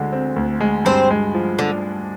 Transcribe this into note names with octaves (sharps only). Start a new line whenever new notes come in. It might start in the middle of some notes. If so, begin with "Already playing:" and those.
Already playing: D2 D3 G#3
C4
D2
G#3
G2 C4 C5
G#3
F3
D3 D4